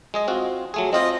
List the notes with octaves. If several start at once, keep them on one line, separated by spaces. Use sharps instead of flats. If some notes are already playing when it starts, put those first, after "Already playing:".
G#3 G#4 D#5
C4 F4 F#4
F#3 A3 G#4
C4 F4 C5 D#5